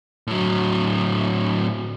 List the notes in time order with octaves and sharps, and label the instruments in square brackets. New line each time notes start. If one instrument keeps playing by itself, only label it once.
[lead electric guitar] A2 F#3